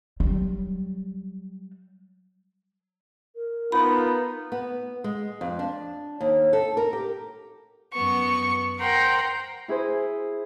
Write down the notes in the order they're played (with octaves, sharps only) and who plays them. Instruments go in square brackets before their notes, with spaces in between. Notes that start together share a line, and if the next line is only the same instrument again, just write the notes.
[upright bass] F#3 G3
[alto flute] A#4
[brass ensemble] B3 F4 B4 [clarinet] D#4 [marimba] B5
[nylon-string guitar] B3
G#3
F2
D4
D#2
A4
A#4
G4
[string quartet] F#2 B3 C#6
A#4 C5 F#5 G5 A#5 C6
[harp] E4 G#4 C5